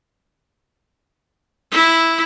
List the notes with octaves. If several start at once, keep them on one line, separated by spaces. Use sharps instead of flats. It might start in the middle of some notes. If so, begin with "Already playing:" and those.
E4